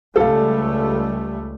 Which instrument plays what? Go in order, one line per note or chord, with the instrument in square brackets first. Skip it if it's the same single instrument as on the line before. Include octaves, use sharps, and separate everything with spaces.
[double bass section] C#2 G3 A3 [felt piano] A4 F5